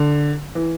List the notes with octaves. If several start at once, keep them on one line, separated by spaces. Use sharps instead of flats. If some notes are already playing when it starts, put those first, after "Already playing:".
Already playing: D3
E3